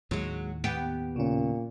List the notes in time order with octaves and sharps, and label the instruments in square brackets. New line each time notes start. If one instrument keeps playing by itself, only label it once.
[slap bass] D#2 A2 D#3 [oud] F#3 G#3
[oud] B3 G4
[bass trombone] A#2 [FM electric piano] C#3 C#4